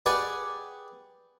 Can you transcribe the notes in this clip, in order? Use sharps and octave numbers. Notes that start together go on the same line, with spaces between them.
G4 G#4 B4 D5 F#5 G#5